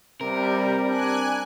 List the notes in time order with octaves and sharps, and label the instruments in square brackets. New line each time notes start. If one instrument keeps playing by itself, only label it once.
[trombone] C3 [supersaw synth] G3 [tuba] C4 [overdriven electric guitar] A#4
[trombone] D4 [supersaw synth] G#5 F#6